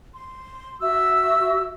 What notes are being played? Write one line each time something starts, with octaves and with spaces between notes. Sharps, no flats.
C6
F#4 E5 E6